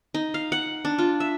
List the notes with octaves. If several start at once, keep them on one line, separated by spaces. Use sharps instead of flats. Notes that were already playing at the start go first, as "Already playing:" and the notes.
D#4
F5
F#5
D4
F4
E5